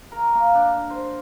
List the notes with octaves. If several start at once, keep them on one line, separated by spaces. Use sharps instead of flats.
A#4
A#3
D4
C5